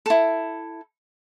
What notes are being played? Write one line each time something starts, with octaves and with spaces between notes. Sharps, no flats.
E4 A4